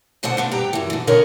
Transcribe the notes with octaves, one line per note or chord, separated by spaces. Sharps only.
D2 B2 D3 C5 F#5
B2 B3 D4
G2 G4 G5 A#5
F#2 E3
B2 D3
B2 D3 E3 A#4 C#5 D#5